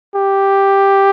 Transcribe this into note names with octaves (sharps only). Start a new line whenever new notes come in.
G4